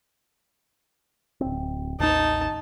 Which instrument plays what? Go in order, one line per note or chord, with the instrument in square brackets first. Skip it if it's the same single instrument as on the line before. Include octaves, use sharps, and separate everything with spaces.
[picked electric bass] D1 C4
[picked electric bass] A1 D#2 [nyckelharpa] D#4 A5